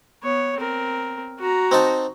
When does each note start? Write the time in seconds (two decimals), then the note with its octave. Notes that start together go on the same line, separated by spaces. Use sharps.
0.24 B3 C#5
0.57 C4 A#4
1.39 F#4 A#5
1.71 C4 D#4 A5